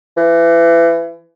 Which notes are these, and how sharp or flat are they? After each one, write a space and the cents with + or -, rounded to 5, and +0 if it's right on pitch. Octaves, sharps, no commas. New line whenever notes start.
E3 +30